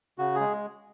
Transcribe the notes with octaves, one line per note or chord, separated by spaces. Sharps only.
C#3 F#4
G#3 G#4